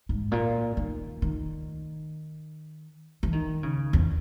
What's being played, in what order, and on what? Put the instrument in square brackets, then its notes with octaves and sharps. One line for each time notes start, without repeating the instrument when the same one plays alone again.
[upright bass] G#2
A#2
D#3
D#3
E3
D#3
C#3
E2